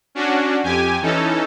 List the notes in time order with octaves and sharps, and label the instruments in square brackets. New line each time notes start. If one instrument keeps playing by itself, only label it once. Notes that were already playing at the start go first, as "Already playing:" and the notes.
[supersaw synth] C#4 D4 F#4
F2 G4 G#5
E3 C#4 D#4 A4